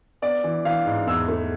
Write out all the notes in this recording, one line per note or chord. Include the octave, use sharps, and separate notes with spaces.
B3 D5
E3
E3 F5
G#2
E2 E6
A3